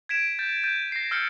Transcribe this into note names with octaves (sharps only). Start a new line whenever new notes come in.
G#6 B6 D7 E7
G6 A6
G6 A6 D#7
A#6 C7
E6 F6 G6 A6 C#7